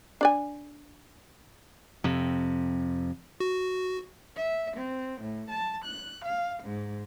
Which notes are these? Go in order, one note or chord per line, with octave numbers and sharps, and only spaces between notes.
D4 D5 G#5
F2 C3
F#4
E5
C4
A2
A5
F#6
F5
G#2